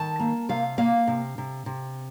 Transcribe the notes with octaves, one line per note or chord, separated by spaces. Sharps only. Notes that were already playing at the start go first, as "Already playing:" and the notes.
Already playing: D#3 A5
A#3
C3 F5
A#3 F5
C3
C3
C3